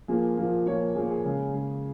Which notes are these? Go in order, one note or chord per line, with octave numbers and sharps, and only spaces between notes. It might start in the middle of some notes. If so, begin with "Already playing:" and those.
A#2 F3 A#3 G#4
A#2 F3 A#3
A#2 F3 A#3 C#5
A#2 F3 A#3 G#4
G#4
C#3 G#3 G#4
C#3 G#3